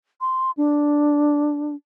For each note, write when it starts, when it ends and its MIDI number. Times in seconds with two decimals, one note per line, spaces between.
0.21 0.51 84
0.57 1.75 62